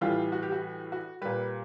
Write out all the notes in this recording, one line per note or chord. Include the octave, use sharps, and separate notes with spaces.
A2 E3 G3 F4
F#4
G4
F#4
F#4
A#2 G3 B4